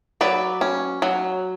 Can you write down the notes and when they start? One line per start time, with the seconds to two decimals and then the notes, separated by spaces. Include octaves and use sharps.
0.21 F#3 B4 D5
0.61 C#4
1.02 F#3